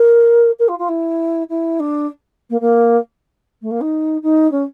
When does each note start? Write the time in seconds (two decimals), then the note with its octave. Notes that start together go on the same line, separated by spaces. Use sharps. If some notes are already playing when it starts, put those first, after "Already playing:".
Already playing: A#4
0.59 A#4
0.68 F4
0.78 F4
0.88 E4
1.49 E4
1.79 D4
2.50 A#3
2.60 A#3
3.62 A3
3.71 A#3
3.81 D#4
4.22 D#4
4.51 C#4